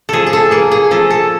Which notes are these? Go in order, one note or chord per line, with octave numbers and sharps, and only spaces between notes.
F3 G#4 A4
G#4
A4
A#3 G#4
G#4
F3 A4
A4